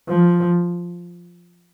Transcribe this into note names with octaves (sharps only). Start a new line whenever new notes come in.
F3